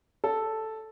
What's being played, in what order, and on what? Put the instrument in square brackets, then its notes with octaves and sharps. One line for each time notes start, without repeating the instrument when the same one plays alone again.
[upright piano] A4